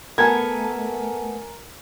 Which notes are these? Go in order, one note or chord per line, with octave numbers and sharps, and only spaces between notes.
A3 B3 A4 A#4 G#5 G#6